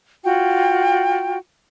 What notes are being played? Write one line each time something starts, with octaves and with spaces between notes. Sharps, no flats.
F4 F#4 G5